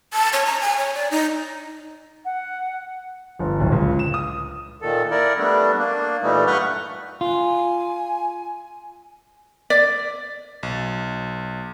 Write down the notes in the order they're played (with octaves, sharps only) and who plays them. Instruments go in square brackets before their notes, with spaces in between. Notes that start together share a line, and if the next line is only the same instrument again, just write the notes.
[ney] A5
C#5
A#5
G#5
C#5
D5
D#4
[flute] F#5
[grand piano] G1
D1
C#2
E7
D#6
[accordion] A#2 D#3 A4
E4 A#4 D5
G3 A3 B3 D4
A#3 D4
A#2 E3 G3 A3 D#4
G2 B4 F#5 C#6 F6 G6
[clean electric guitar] F4 [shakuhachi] G#5
[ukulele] D5 [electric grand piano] A6 B6
[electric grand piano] B1